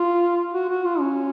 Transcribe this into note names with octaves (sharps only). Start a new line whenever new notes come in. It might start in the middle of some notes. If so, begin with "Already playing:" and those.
Already playing: F4
F#4
F#4
F4
C#4